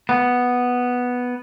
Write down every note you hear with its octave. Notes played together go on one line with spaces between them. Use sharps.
B3